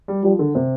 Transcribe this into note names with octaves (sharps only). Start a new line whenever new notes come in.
G3
F3 G3
D3
C3